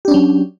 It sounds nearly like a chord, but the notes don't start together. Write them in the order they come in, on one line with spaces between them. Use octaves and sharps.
G4 D4 C#4 F#3